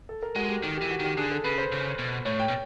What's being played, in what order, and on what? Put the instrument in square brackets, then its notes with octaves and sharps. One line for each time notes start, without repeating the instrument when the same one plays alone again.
[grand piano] A4
A#4
[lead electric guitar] G#3 [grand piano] F#4
[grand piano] G4
[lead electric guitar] D#3 [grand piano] G4
[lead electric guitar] E3 [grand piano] G4
[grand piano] F#4
[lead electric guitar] D#3 [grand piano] G4
[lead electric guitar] D3 [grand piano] G#4
[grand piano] A4
[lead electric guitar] C#3 [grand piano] B4
[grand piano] C5
[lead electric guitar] C#3
B2
[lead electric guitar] A2 [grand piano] C#5
[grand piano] G5
[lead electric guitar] B2